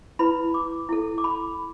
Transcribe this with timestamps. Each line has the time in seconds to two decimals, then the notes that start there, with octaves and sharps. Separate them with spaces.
0.19 E4 B4 B5
0.54 D6
0.89 E4 A4
1.18 D6
1.24 B5